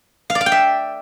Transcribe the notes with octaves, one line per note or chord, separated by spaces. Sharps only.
F5
D5
F5
G5
E5